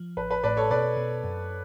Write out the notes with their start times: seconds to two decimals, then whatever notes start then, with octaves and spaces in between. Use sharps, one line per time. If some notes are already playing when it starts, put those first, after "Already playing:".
Already playing: F3
0.17 A1 B4
0.31 B4
0.43 A2 B4 D5
0.57 A4 C#5
0.71 B2 B4 D5
0.97 B2
1.24 F#2